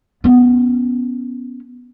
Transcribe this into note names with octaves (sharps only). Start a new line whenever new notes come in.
B3 C#4